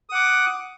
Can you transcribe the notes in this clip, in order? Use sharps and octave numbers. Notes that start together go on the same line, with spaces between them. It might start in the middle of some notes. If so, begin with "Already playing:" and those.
F#5 D6 D#6